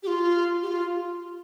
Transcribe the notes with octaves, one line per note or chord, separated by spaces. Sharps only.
G4
F4
G4
F4